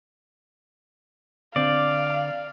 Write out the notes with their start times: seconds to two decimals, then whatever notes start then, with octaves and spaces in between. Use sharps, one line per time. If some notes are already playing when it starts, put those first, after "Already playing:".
1.56 D3 C4 D5 F5